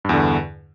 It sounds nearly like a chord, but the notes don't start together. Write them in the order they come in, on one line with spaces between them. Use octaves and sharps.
G2 E2 D3